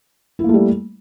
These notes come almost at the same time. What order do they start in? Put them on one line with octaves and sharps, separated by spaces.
E4 A#3 A3 G3